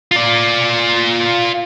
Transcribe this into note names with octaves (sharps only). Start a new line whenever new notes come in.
F4 D5